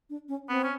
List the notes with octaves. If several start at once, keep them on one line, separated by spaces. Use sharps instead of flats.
D4
C#4
B3 C4
C#4